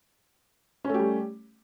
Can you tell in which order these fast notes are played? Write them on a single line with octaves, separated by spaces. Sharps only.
C#4 A3 G4 G3